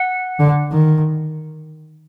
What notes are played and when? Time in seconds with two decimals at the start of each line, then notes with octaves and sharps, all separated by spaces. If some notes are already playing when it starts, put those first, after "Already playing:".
Already playing: F#5
0.40 D3
0.72 D#3